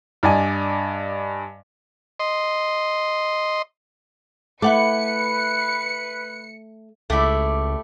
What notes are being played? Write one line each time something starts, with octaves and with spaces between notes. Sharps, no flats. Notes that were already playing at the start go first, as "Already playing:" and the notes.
G2 D5 D#5 G#5
D#5 C6
A3 E4 B4 F#5 D6 C#7
C#2 A3 E4 G4 D5